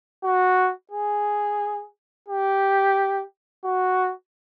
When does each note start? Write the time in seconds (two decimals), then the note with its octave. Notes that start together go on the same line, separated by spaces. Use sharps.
0.24 F#4
0.91 G#4
2.29 G4
3.65 F#4